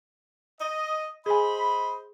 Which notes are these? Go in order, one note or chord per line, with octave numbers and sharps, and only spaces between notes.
D#5
G#4 C5 D#5 G#5 B5